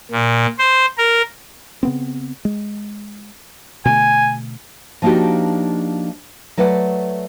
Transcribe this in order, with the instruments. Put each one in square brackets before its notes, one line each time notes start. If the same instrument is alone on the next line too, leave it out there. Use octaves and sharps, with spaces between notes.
[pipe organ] A#2
C5
A#4
[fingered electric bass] C#3 B3 C4
G#3
[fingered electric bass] B2 D3 A3 [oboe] G#5
[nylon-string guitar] F3 A#3 D4 D#4 F#4 G4
F#3 A3 B4 D5 F#5